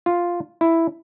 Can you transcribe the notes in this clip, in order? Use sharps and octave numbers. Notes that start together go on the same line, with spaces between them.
F4
E4